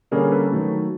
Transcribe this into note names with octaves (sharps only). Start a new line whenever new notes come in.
D3 G3 A#3 C#4 G#4 A#4
A4 B4
D#3 F#3 A3